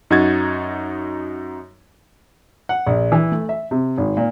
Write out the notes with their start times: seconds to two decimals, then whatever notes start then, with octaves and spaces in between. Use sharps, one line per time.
0.10 F#2 D#4 F#4 G#6 A6
2.69 F#5
2.87 A#1
3.12 E3
3.32 A3
3.49 E5
3.71 C3
3.97 G#1
4.17 A#2